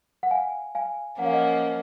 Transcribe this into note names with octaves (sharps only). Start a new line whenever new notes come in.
F#5
F5 G#5
F5 G#5
F3 A#3 C#4 F#5
F5
D#5 F#5